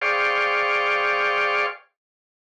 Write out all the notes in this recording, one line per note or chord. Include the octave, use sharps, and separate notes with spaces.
G#4 C5 D5 F5 G5 C#6